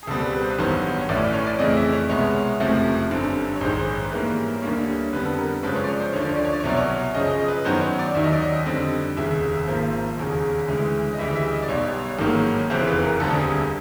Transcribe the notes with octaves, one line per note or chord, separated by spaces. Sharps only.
G#4
C#2 B2 G3 C4 A4
B4
C5
B4
A1 G2 D#3 F#3 B3 C5
C#5
A1 A2 E3 A3 C#4 D5
C#5
D5
F2 C#3 E3 A3 D#5
E5
C#5
C2 B2 G#3 B3 C#5
F#1 F2 C3 F3 A3
G1 F#2 D3 G3 C4
C#5
A#1 G#2 D#3 C5
B4
G#2 E3 G3 A#3 C#4 A#4
D2 D3 G3 A#3 C#4
F2 D3 G3 B3 B4
A4
A#4
F#2 C#3 F3 G#3 C#4 B4
C#5
D5
C#5
C5
D2 D3 F3 C#5
D5
C#5
D5
C#5
D5
C#5
C2 B2 F#3 D5
C#5
F#2 C#3 F3 D#5
D#5
B4
F#2 D#3 F#3 B3 C5
C#5
D5
D#2 D#3 F#3 E5
D#5
D5
D#5
F2 D3 G3 C4
F1 D#2 C#3 E5
G#1 G#2 F3 A#3
E1 D#2 C#3
D2 C#3 E3 G#3
D#5
D2 C#3 E3 G3 E5
E5
D#5
D5
B1 B2 G3 C#5
A1 G#2 D#3 F#3 A#3
F1 E2 C#3 E3 C5
B4
A#4
E1 D2 D3 G3 C4 A4
G#4